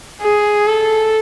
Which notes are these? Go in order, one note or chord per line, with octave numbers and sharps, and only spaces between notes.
G#4
A4